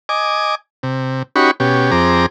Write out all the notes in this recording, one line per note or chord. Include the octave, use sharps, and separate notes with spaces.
D#5 G#5 D6
C3
C#4 D#4 F#4 G4 B5 C#6
B2 C#4 G4
F2 C4 G#4 A#5 D6